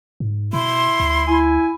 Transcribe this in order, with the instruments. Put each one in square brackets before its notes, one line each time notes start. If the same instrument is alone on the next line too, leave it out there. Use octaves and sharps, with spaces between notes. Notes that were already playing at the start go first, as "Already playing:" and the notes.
[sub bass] G#2
[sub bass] B2 [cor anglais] E4 [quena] C6
[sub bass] D2
[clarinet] E4 [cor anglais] G#5